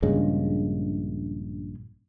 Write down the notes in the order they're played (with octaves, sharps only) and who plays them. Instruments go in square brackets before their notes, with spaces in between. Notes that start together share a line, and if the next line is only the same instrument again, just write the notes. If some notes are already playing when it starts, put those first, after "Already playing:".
[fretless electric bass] A#1 G2 C#3 G#3